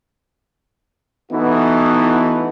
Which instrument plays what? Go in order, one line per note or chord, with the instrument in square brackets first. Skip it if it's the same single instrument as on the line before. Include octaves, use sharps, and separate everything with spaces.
[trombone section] E3 A3 B3 D#4 E4 F#4